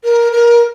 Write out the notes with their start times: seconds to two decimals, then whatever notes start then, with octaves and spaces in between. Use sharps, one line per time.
0.04 A#4
0.32 A#4